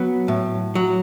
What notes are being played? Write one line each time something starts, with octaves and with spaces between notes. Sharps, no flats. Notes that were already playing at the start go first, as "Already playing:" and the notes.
Already playing: F#3 B3
A2
F#3